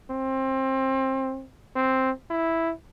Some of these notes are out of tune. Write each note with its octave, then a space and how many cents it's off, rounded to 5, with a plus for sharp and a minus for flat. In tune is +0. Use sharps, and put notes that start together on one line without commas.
C4 +25
C4 +5
E4 +0